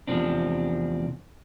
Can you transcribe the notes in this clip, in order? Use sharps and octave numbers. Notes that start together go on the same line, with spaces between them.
E2 C3 F3 C4 D4